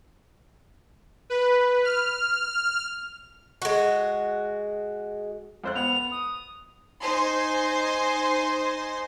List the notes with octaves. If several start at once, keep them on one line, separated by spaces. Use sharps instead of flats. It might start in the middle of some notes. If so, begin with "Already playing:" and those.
B4
F6
G#3 F#4
F2 C5 F#6
B3 F#5 F7
D#6
D#4 C5 G#5 C6